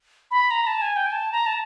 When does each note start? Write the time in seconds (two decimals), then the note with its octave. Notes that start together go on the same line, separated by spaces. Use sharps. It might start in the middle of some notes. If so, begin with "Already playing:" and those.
0.31 B5
0.51 A#5
0.67 A5
0.82 G#5
0.96 G5
1.06 G#5
1.12 A5
1.32 A#5
1.46 A5